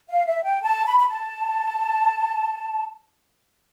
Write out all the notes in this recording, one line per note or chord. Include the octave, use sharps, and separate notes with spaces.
F5
E5
G5
A5
B5
B5
A5